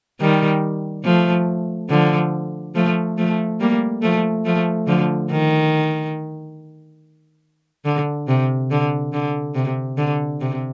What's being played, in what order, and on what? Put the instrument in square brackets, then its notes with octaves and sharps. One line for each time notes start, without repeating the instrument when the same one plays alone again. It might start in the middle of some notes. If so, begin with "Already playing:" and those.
[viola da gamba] D#3 G3
F3 A3
D3 F3
F3 A3
F3 A3
G3 A#3
F3 A3
F3 A3
D3 F3
D#3
D3
C3
D3
D3
C3
D3
C3